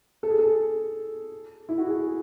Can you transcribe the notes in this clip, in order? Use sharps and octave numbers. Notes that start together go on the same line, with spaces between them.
A4
G#4
A4
E4
F#4
G#4